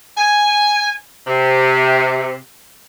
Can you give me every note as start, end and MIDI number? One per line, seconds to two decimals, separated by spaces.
0.17 0.91 80
1.27 2.34 48